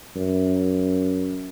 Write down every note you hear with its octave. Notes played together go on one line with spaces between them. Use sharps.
F#2